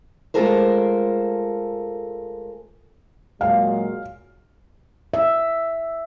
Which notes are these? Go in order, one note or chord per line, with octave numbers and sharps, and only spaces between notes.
G#3 A3 F4 A4 A#4 C5
A#2 F#3 G#3 F5
E5